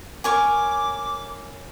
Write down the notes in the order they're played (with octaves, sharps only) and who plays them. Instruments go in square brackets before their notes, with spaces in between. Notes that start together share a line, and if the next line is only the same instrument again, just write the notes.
[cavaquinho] A#4 C#5 G#5 [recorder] D6